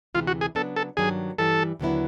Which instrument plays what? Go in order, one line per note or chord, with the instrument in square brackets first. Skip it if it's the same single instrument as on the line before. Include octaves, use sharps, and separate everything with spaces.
[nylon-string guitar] D2 C3 E3 G#3 [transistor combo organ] F4
[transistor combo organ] F#4
G#4
[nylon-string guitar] C#3 F#3 B3 D4 [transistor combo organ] A4
[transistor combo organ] A4
[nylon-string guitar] G2 D#3 F#3 A#3 D4 [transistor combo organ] G#4
[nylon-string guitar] G2 E3 G3 [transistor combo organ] A4
[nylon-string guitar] D#2 D3 F#3 B3 E4